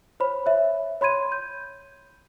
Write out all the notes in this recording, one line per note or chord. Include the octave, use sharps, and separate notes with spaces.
C5 C#5 B5
C#5 E5
C#5 B5 C6 G#6 D#7
G6